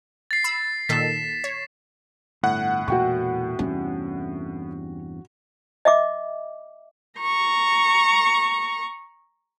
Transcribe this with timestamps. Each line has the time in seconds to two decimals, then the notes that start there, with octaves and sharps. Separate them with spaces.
0.31 A6 C7
0.44 B5 E6
0.89 A#2 D#3 A4 B6 E7
1.44 C#5
2.43 G1 A2 F#5
2.88 E1 A#2 F#4 G5 C#6
3.59 E2 G2 C3 C#4
5.85 D#5 E5 D6
7.20 A#5 C#6